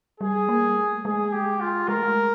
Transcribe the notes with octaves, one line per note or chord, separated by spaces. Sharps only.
G3 G#4
A#3
A3
G#3 G#4
G4
F4
G#3 A#4
A3
G#3